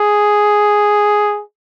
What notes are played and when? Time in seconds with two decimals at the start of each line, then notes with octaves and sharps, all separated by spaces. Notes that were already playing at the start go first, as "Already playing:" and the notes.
Already playing: G#4